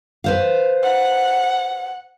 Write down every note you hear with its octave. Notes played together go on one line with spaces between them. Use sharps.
B4 C5 F5
F#5